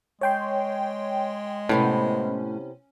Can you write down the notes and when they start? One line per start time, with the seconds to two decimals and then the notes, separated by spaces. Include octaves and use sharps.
0.21 G#3 C#5 G5 C6
1.69 A2 C3 B3 C#4 E4